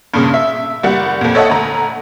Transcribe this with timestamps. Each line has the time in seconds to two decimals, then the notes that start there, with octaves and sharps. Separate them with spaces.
0.14 G2 A#2 C#3
0.34 E5
0.83 F#1 G3 F#5
1.21 F2 A#2
1.35 A4 C#5 D#5 E5 F#5
1.49 D2 A#5